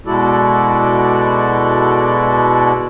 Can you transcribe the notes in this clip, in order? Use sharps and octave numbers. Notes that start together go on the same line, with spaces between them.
B2 G#3 E4 F#4 A4 D5